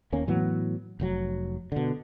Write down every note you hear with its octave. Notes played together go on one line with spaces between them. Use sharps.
D#2 A#3 C#4
A2 E3 F#3 B3
F1 A#2 F#3
B2 D3